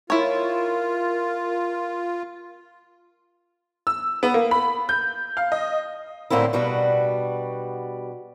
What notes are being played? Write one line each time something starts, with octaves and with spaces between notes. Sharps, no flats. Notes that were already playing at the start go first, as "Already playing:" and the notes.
E4 F4 A#4 C#5
E6
B3
A#3
B5
G6
F5
D#5
A2 D3 A#3 C4 E4
B2 G3 D4 F#4